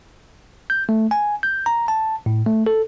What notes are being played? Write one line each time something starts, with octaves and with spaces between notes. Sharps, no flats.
G6
A3
G#5
G6
A#5
A5
A2
A3
A4